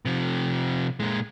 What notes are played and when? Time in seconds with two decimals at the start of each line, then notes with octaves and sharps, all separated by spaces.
0.05 C3 F3
1.00 A#2 G#3